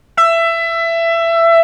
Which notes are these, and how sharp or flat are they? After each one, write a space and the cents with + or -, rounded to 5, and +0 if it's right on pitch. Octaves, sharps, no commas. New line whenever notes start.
E5 +20